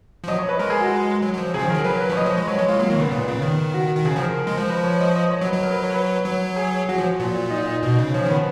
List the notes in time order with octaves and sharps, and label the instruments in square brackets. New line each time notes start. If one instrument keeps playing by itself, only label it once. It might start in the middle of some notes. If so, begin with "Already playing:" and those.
[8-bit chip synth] F3
[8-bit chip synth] F#3 [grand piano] D#5
[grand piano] C#5
B4
[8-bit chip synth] G#3 [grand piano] A#4
[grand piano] G#4
F#4
[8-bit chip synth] F#3
F#3
F3
[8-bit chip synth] C#3 F3 [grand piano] G#4
[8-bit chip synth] D#3
[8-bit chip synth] F#3 [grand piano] A#4
[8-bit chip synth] F#3 [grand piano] B4
[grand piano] B4
[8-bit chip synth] F3 [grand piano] C#5
[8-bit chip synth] F#3 [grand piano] D#5
[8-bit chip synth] F3
G#3
[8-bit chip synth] F#3 [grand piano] C#5
[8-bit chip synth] G#3 [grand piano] C#5
[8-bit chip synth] G#3 [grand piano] F4
[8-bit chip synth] F#3 [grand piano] A#3
[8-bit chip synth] D#3 [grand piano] A#3
[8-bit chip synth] C#3 [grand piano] B3
[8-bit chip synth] A#2
C#3
D#3
[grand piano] F#4
[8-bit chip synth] D#3
[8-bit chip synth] C#3 [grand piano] G#4
[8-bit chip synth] F3
[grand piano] A#4
[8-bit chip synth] G#3
F3
[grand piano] B4
C#5
D#5
D#5
C#5
[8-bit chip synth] F#3
[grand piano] B4
[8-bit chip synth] F#3
[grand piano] A#4
B4
C#5
B4
[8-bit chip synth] F#3
[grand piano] G#4
[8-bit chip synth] F#3 [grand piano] F#4
[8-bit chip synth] F3
A#2
[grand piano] D#4
[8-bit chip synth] B2
C#3
[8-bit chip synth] F3 [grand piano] C#4
[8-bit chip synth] D#3 [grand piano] B3